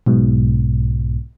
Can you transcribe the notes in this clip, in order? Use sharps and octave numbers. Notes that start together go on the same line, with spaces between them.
B1 G#2 B2